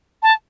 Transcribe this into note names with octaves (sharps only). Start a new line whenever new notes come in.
A5